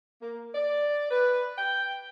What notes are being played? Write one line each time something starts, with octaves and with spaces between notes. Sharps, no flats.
A#3
D5
B4
G5